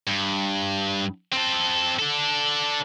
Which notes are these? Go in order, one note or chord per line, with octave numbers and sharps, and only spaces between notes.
G2
C4 A4
D4 A4